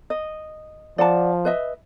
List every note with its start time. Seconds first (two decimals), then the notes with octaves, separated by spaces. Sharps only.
0.10 D#5
0.98 F3 D5 F#5 A5
1.45 B4 D#5 E5